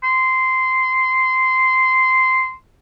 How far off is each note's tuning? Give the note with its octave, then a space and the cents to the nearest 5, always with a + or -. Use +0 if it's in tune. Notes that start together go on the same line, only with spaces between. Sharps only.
C6 -10